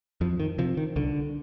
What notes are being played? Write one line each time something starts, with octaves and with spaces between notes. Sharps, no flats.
F2 F3
D#3
C3 F3
D#3
C2 D3